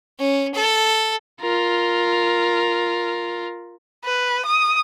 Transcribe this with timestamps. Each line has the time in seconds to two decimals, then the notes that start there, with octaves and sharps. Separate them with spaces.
0.19 C#4
0.55 A4
1.41 F4 A#4
4.05 B4
4.46 D#6